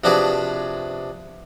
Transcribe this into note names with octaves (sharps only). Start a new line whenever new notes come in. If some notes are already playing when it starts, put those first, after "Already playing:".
C3 F3 D4 F#4 G#4 B4